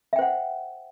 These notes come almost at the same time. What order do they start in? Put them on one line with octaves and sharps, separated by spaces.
E5 G5 C5 F#5